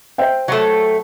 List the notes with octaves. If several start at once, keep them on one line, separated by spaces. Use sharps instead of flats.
C5 E5 G5
F#3 A3